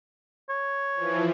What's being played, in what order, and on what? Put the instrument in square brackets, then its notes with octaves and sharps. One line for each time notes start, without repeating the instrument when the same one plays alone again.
[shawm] C#5
[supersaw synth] E3 F3